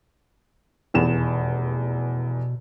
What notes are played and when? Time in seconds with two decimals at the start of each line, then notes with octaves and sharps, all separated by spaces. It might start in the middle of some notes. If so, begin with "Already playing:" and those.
0.94 F1 E2 B2 E7